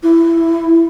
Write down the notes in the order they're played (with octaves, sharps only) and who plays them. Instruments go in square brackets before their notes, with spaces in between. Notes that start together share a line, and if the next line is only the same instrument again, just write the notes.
[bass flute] E4